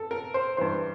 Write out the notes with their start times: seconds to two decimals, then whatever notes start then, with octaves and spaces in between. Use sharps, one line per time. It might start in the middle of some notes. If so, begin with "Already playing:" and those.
Already playing: A4
0.11 A#4
0.34 C5
0.57 G2 E3 C5